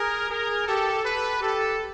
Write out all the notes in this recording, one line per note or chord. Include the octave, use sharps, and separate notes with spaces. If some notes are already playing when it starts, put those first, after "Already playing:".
Already playing: G#4 A#4
G#4 A#4
G4 A4
A4 B4
G4 A4